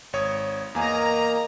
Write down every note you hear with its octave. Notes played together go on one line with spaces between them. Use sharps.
G#1 C#5 D#6
E2 A#3 A#4 D#5 G#5 A#5